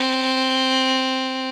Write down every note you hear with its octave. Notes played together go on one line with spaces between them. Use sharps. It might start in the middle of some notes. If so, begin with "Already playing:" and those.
Already playing: C4